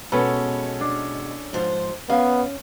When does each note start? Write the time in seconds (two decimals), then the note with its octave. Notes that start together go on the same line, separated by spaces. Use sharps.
0.12 B2 G#3 C#4 A4 B4
0.81 D4
1.53 G#2 F3 C5
2.10 B3 C#4 F5